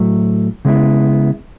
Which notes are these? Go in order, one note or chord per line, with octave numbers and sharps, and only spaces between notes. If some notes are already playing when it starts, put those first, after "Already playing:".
Already playing: A2 F#3 A3
C#3 G#3 B3 E4